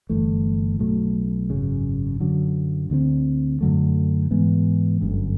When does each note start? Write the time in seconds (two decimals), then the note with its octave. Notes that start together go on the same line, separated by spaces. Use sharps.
0.09 G1 G2 E3 A3
0.79 B1 A2 F#3 A3
1.50 G#1 F#2 C#3
2.20 F#2 D3 F#3
2.90 D2 D3 G3 C4
3.61 F#2 D3 F#3 A3
4.31 G#2 E3 G#3 B3
5.01 G1 F#2 D3